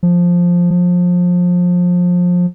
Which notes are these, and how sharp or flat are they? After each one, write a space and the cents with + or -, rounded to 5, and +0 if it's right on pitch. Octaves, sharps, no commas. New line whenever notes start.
F3 +5
F3 +25